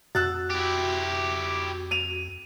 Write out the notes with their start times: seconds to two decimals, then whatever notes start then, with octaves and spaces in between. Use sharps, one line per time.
0.15 F2 F#4 E6 F#6 A6
0.51 E4 G4
1.91 D#7 F7